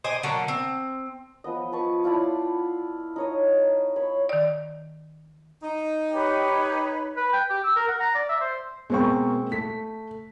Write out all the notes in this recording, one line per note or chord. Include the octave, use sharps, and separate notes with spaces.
C5 D5 D#5 G#5
D3 F#3 A#3
C4
F3 B3 D#5
B4 A5 C#6
E4 F4 D5 A5
D#4 C#5 D#5
C#5 B5
D#3 D5
D#4
G4 B4 C#5
B4
G5
G4
E6
A#4
F#5
A#5
D5
E5
C5
B2 G#3 A#3 C4 G5 C#6
A3 B6